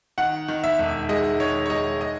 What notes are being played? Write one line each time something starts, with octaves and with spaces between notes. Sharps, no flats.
D#3 F#5
D#3
E5
E1
G#3 D#5
D#3 C#5
C#5
G#3 D#5
D#5